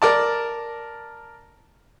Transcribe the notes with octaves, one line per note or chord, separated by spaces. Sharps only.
A#4 D5 A5